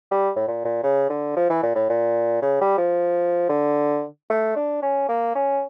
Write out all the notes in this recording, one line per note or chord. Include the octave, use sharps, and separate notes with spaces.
G3
A2
A#2
A#2
C#3
D3
F3
E3
A#2
A2
A#2
C#3
G3
F3
D3
A3
D4
C#4
A#3
C#4